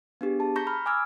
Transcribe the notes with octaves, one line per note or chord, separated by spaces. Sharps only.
B3 D4 G4 G#4
G#4 A5
A#5 C#6 G6 A#6 B6
B5 F6
G#5 D6 E6 F6 G#6